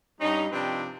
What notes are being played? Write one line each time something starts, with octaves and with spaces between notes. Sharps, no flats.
G2 G3 C#4 D#4
C3 F3 C4 D4 B4 G5